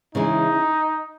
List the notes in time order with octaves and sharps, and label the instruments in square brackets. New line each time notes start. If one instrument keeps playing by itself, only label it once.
[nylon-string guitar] C#3 E3 G#3 [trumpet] D#4